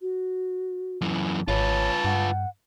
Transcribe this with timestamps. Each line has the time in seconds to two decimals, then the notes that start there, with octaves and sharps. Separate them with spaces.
0.01 F#4
1.02 F#2 E3
1.48 G#1 F4 B4 C#5 A5
2.05 G2 F#5